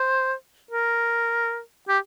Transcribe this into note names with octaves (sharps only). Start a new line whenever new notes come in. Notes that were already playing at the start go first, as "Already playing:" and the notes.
Already playing: C5
A#4
G4